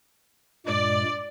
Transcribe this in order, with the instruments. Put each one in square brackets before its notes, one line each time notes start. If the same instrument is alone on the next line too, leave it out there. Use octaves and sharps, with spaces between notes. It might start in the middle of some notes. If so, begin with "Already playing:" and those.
[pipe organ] G2 A#2 G#3 [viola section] D5